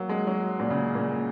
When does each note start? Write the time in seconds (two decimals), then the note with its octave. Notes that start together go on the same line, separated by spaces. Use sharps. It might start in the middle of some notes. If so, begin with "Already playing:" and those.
Already playing: F#3 A#3
0.09 G#3
0.27 F#3
0.60 A#2
0.70 C#3
0.95 A#2